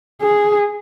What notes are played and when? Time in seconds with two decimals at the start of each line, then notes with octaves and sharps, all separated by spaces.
0.22 G#4